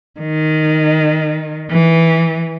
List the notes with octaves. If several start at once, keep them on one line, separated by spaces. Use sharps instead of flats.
D#3
E3